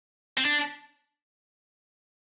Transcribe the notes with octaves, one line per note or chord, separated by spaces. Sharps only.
C4
D4